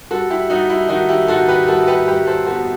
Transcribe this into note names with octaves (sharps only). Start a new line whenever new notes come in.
G3 F#4 A4
E4 G4
G3 D#4 F#4
E4
D#3 D#4 F#4
E4 G4
D#3 F#4 A4
G4 B4
G3 F#4 A4
A4
G4 B4
G3 G4 B4
A4 C5
B3 F#4 A4